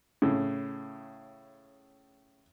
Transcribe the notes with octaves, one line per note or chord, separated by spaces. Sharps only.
A2 C#3